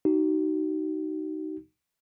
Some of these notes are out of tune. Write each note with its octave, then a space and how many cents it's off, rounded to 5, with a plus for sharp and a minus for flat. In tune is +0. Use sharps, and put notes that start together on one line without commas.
D#4 +0 F#4 +40